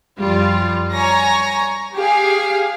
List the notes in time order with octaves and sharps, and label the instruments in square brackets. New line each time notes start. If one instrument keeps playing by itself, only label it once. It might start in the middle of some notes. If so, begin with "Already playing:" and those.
[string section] F#2 F3 G3 F4
C#5 G#5 A#5 A#6
G4 G#4 F5 G#5